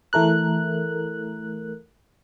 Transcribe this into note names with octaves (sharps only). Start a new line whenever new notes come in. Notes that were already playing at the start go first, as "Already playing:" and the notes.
E3 A3 A#4 F#6